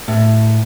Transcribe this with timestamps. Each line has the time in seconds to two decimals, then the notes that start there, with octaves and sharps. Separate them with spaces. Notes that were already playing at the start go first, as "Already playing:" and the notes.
0.08 A2